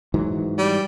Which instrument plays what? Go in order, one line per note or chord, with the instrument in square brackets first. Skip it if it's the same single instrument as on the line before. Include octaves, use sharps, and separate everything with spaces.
[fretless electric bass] G#2 E3 F#3
[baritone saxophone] G3